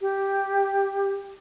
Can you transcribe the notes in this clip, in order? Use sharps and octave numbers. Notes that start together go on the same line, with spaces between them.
G4